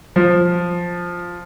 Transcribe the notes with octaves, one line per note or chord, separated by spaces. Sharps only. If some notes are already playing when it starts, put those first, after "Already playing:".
F3